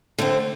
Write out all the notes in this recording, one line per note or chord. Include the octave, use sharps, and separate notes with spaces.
D3 A3 C4